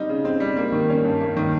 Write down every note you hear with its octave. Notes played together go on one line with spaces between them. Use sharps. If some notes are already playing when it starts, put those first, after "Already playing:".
Already playing: G3 C4 D#4
C#3
C4
G3
A#3
D#3
C#4
G2
A#3
D#3